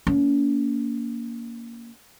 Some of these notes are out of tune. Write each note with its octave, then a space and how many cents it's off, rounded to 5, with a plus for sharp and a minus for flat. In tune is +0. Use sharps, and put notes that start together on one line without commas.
A#3 +0 C#4 +40